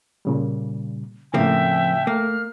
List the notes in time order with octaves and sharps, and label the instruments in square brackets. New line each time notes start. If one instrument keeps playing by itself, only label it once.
[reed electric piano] A#2 C#3 G3
[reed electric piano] A2 C#3 [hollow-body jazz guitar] F3 A#3 C4 [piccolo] E5 [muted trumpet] G5
[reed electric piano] A3 [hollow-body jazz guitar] A#3 [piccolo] F6